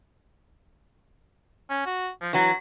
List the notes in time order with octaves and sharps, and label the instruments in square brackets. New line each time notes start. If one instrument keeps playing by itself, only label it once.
[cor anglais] C#4
F#4
F3
[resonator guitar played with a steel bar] E3 F#3 [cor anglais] F#4